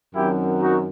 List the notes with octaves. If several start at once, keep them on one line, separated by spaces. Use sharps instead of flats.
F#2 D#3 F#3 C4 E4 G4
D#4 F#4